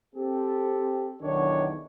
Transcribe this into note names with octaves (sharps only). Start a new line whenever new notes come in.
C4 G4 A4
B1 E2 D#3 D4 C#5